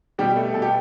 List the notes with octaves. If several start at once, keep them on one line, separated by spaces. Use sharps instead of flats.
B2 G3 G4
A3
B2 A4
G4